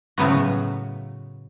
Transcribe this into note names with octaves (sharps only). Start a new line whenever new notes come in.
A2 C#3 F#3 B3 F#4